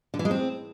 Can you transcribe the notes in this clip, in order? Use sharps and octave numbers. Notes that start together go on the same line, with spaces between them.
D3
E3
G#3
C4